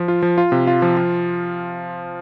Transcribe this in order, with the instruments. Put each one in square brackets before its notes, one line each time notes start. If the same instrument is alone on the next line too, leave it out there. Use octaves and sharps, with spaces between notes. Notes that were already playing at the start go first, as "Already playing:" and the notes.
Already playing: [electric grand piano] F3
F4
F3
F4
C3
F4
F3
F4